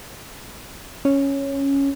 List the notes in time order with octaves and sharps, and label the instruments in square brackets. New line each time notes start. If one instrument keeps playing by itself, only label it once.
[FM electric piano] C#4